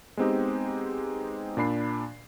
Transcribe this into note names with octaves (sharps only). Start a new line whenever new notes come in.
G#3 B3 C4 D#4 G4
A#2 D4 B5 C7